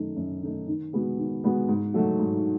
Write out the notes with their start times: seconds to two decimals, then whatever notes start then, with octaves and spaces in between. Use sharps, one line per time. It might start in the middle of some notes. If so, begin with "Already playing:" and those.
Already playing: F#2 D#3 A3 D#4
0.16 F#2
0.41 D#3 A3 D#4
0.67 D#3
0.93 G#3 B3 F#4
1.17 D#3
1.44 G#3 B3 F#4
1.69 G#2
1.94 F#3 A3 D#4 F#4
2.19 G#2